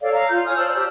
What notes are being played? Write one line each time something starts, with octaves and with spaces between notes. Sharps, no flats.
A4 C#5 D5 F5
F5 A#5
F4 G6
C#5 G#5 D#6 F6
C5 D5 A5 E6
G4 D5 E6 F6